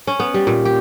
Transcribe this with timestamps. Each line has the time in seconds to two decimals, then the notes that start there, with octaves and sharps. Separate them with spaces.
0.07 C#4
0.20 B3
0.34 G3
0.47 A#2
0.65 G4